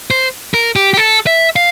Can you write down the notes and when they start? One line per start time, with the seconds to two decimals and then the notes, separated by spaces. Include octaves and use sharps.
0.11 C5
0.54 A#4
0.76 G4
0.94 G4
0.97 A4
1.27 E5
1.56 F5